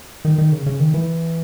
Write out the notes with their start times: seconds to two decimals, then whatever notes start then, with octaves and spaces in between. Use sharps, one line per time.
0.25 D#3
0.38 D#3
0.52 C#3
0.66 C#3
0.80 D#3
0.94 E3